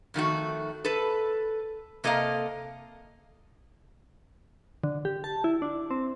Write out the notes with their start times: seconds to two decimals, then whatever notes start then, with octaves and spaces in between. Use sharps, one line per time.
0.14 F2 D#3 A3 F#4
0.85 A4 B4
2.04 C3 A#3 A4 D#5 F5
4.84 D3
5.05 G4
5.24 A5
5.44 E4
5.62 D4
5.91 C4